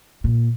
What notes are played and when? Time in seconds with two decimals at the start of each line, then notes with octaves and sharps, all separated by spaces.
0.24 A#2